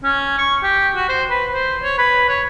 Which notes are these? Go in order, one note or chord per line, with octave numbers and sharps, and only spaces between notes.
C#4
C#6
G4
F#4
C5
B4
C5
C#5
B4
C#5